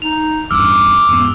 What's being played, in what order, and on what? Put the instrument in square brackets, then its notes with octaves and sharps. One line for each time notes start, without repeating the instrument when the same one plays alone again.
[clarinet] D#4 [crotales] F7
[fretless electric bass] A1 E2 G2 [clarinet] D6 [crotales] E6 F6
[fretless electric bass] E2 G#2 B3